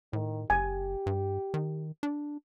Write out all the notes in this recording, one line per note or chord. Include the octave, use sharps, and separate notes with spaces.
A2 D#3
F#1 G4 G#5
G2
D#3
D4